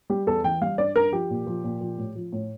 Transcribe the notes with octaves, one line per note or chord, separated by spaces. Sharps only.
G3 G4
E2 A4
E3 G5
G3 F5
G2 D5
G2 A#4
F3 G4
A#2
F3
A#2
F3
A2
F3
A2